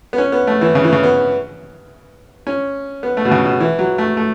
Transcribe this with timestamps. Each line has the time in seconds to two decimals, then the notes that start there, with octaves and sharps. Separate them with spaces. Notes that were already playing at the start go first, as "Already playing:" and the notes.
0.13 B3
0.18 C#4
0.32 B3
0.47 A3
0.61 E3
0.75 C#3
0.84 E3
0.92 C#3
1.03 B3
2.47 C#4
3.03 B3
3.17 A3
3.25 B2
3.31 C#3
3.45 B2
3.60 E3
3.79 F#3
3.98 A3
4.17 A3